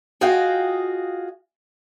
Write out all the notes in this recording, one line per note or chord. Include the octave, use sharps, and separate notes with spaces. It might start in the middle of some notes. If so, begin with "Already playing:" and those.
F4 F#4 G#4 D#5 F5 G5